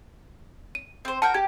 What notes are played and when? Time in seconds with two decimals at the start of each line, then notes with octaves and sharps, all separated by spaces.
0.75 D#7
1.05 C4 C5
1.22 F#4 A#4 G5 A5
1.34 G4 G#6